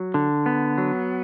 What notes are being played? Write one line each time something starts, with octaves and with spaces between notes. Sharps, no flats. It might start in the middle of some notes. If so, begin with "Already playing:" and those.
Already playing: F#3
D3
B3
F#3